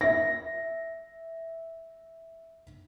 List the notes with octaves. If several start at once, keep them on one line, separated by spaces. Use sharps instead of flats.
E5 A#6